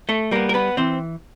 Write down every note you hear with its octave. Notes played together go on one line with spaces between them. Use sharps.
A3 A4
G3 A#3 B3 A#4
A#4
B3 B4
E3 C4 C5